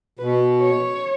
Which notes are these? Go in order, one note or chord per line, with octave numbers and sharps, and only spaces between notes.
B2 B4
C#5